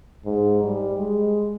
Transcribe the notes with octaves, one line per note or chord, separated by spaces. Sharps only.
G#2
G3
G#3